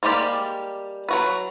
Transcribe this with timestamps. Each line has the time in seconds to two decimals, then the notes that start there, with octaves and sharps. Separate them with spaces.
0.03 G3 G#3 A#3 G4 D5
1.09 F#3 F#4 B4